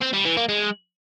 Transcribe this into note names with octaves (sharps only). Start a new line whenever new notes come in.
C4
G3
E3
A#3
G#3